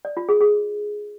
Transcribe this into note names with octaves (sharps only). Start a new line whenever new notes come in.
D5
F4
G#4
G#4